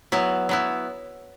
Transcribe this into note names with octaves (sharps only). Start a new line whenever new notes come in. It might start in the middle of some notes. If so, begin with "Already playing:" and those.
F#3 B3 E4
F#3 B3 E4